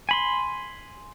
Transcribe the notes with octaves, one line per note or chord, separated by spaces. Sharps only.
G#5 B5 C6